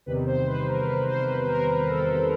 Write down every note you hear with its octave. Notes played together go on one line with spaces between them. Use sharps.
E2 C3 D#3 G3 B4
C5
B4
A#4
B4
C5
B4
A#4
B4
A4
A4